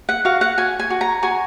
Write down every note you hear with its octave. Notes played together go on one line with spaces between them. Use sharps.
F#5
F#4 F5
F#5
F#4 G#5
G#5
F#4
A#5
F#4 G#5